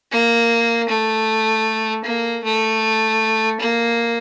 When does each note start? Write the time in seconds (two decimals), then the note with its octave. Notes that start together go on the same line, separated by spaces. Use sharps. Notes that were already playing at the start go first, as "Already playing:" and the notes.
0.11 A#3
0.89 A3
2.05 A#3
2.44 A3
3.60 A#3